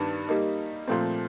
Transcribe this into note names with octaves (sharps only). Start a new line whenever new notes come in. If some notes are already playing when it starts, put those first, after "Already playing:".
Already playing: G2 D#3 G3 B3 D4
G3 A#3 D#4
A#2 F3 A3 C4